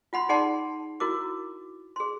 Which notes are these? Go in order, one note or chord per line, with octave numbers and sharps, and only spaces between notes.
F4 F#5 B5 C6
D#4 G#4 D5 F#5 A5 C6
E4 F#4 A#4 D6
G#4 C6